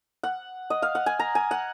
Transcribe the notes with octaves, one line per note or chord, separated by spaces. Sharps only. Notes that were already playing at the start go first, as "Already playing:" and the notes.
F#5
D#5
F5
F#5
G#5
A#5
G#5
F#5